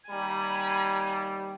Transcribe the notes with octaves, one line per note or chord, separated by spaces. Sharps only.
D#2 G3 G#5 A#5 B5